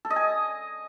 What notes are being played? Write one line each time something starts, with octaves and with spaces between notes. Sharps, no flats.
A4
D#5
G#5